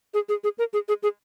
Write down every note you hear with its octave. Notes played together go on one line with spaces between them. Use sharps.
G#4
G#4
G#4
A#4
G#4
G#4
G#4